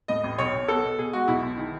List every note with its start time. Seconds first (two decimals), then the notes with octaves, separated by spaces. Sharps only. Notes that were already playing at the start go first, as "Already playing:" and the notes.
0.08 A2 D#5
0.23 A1
0.38 B1 C#5
0.54 B1
0.68 B3 A4
0.84 B2
0.98 B2 G#4
1.13 G#3 F#4
1.28 B1 E4
1.43 B1
1.57 D#3